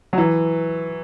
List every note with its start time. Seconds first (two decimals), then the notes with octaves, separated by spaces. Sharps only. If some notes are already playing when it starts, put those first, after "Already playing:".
0.13 F#3
0.18 E3